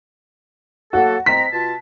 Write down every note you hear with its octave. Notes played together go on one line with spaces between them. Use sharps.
F#3 A#3 F#4 A4
C4 D#5 A#5 B6
B2 F4 A5